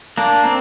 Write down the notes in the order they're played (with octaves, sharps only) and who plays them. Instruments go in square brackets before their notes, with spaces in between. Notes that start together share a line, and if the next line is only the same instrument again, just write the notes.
[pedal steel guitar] A#3 D4
C4